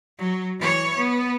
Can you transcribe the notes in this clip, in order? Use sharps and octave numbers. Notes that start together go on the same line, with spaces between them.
F#3
E3 C#5
B3